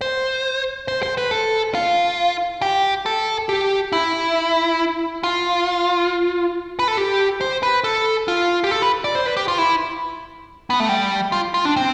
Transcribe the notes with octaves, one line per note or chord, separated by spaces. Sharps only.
C5
C5
C5
B4
A4
F4
G4
A4
G4
E4
F4
B4
A4
G4
C5
B4
A4
F4
G4
A4
B4
D5
C5
B4
G4
F4
E4
B3
A3
G3
F4
F4
D4
C4